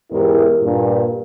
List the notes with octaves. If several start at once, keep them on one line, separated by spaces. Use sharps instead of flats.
E2 G#2 E4 G4 A#4
G2 A#2